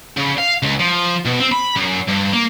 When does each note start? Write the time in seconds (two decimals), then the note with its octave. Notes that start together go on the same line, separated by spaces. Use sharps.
0.17 C#3
0.38 F5
0.63 C#2
0.80 F3
1.25 B2
1.40 C4
1.52 B5
1.76 F#2
2.08 G2
2.33 A#3